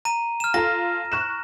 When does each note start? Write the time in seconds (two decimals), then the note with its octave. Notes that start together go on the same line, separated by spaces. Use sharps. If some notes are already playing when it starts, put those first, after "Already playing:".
0.05 A#5 D#7
0.40 F6 E7
0.54 F4 A4 A#5 A#6
1.12 C#6 F#6 E7